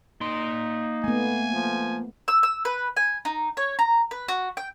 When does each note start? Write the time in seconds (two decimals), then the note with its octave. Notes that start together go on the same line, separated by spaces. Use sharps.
0.21 A#3 D#4 C6
1.04 A3 B3 G#5
1.53 F3
2.28 E6
2.43 E6
2.65 B4
2.97 G#5
3.25 D#4
3.57 C#5
3.79 A#5
4.11 B4
4.28 F#4
4.57 G5